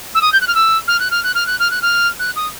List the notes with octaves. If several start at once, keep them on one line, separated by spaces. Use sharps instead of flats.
E6
D#6
G6
F#6
F6
E6
F6
F#6
F6
F#6
F6
F#6
F6
F#6
F6
F#6
D#6